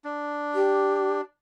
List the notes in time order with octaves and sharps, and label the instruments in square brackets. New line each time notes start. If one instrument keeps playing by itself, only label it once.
[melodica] D4
[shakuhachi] G4